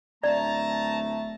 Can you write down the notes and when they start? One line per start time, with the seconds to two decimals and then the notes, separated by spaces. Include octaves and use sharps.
0.23 D1 A3 D5 A5 A#5